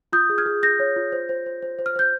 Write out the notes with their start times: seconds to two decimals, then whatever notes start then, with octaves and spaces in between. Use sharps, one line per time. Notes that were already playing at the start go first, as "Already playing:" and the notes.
0.13 F4 D#6 G6
0.30 G#4
0.38 F6 G#6
0.46 G#4
0.63 G#4 G6 A#6
0.79 C#5
0.96 F4
1.12 C5
1.29 C5
1.46 C5
1.62 C5
1.79 C5
1.86 F6
1.96 C5 G6